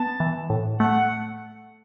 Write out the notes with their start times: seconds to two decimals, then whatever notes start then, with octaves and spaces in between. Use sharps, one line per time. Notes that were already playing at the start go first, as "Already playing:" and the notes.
Already playing: B3 A5
0.20 E3
0.50 A2
0.79 A3 F#5